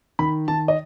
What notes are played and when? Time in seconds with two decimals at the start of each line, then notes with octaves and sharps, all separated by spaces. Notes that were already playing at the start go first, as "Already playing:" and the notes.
0.19 D#3 B5
0.48 D#3 A5
0.68 D#5